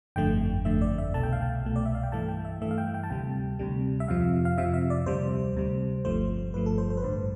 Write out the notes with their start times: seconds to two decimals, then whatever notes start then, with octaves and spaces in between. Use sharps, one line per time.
0.16 G1 F2 D3 A3 G5
0.65 G1 F2 D3 A3 E5
0.81 D5
0.98 E5
1.14 C2 B2 A3 A5
1.23 G5
1.32 F5
1.41 G5
1.63 C2 B2 A3
1.76 D5
1.86 E5
1.95 F5
2.03 G5
2.12 G2 E3 A3 A5
2.29 G5
2.45 E5
2.61 G2 E3 A3 E5
2.71 F5
2.78 G5
2.94 G5
3.03 A5
3.10 D2 C3 G3 G5
3.59 D2 C3 G3
4.00 E5
4.08 F2 C3 F3 F5
4.45 F5
4.58 F2 C3 F3 E5
4.74 E5
4.90 D5
5.06 D2 C3 G3 C5
5.56 D2 C3 G3
6.05 G1 G2 F3 A3 C5
6.53 G1 G2 F3 A3 B4
6.66 A4
6.78 C5
6.90 C5
6.97 B4
7.02 A1 G2 D3 C5